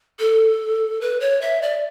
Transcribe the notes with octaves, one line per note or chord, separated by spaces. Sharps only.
A4
B4
C#5
E5
D5